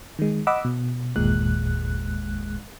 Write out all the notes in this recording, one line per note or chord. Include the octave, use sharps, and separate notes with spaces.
D#3 G#3
D#5 F#5 B5 D6 E6
B2
G1 D#2 A#2 G#3 F#6